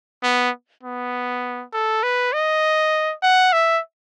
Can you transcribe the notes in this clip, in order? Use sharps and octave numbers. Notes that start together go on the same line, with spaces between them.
B3
B3
A4
B4
D#5
F#5
E5